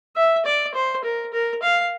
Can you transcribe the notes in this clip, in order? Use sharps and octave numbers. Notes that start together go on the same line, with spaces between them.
E5
D5
C5
A#4
A#4
F5